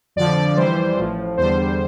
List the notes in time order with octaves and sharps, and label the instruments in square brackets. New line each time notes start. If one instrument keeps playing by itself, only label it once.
[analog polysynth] F2 D3 F3 D5
F2 E3 G3 C5
A1 A2 F3
E2 D3 G3 C5